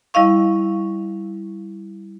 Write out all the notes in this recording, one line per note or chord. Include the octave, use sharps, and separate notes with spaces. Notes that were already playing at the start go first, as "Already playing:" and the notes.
G3 E4 D#5 F5 C#6